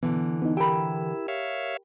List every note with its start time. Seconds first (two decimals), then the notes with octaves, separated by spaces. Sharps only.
0.03 B2 D3 E3 B3
0.42 B3 D#4
0.57 E4 G4 A#4 G5 B5
1.28 C#5 E5 F5